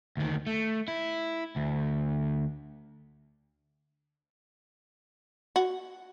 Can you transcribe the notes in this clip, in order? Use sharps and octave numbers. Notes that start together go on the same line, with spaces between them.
D2 D#3
A3
E4
D2
F#4